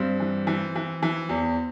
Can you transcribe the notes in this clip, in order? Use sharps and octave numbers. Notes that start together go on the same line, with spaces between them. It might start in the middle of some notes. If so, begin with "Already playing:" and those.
Already playing: G2 C4
E3
E3
E3
E3
E2